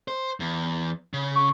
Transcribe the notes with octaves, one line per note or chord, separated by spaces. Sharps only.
C5
E2
C#3
C#6